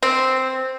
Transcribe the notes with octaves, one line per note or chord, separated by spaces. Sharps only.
C4